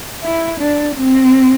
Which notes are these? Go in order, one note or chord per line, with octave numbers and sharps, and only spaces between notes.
E4
D4
C4